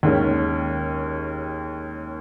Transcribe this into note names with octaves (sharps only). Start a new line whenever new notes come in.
D#2 D#3 G#3 C#4